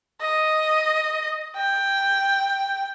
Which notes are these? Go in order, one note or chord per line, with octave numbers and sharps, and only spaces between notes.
D#5
G5